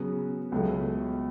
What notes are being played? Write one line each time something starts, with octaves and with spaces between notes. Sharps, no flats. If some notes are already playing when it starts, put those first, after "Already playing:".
Already playing: C#3 F#3 B3 F#4
C#2 B2 F#3 A3